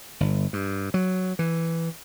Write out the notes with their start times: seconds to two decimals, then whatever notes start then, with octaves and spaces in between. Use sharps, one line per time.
0.20 G1
0.53 G2
0.94 F#3
1.39 E3